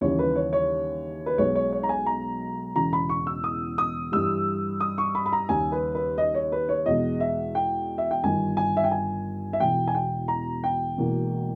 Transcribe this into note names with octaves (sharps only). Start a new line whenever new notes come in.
D#2 C#3 E3 G3 C#5
B4
C#5
C#5
B4
B1 B2 G#3 C#5
C#5
C#5
A#5
G#5
A#5
E1 E2 C#3 A#5
B5
C#6
E6
D#6
D#6
G2 E3 G3 E6
D#6
C#6
B5
B5
A#5
D#2 C#3 G3 G#5
B4
B4
D#5
C#5
B4
C#5
E2 B2 G#3 D#5
E5
G5
E5
G5
G1 G2 D#3 G#5
G#5
E5
G5
G#5
E5
E1 E2 B2 G5
G#5
G5
A#5
G5
E1 E2 B2 A#3